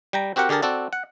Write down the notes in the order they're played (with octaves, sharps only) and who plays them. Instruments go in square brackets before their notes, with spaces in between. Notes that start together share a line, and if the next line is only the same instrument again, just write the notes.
[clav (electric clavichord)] G3 G5 A#5
C4 F#4 G4 A#4 F#5
D3 G4 G#4 A#4 A5
C4 F#4 A4 D5
F#5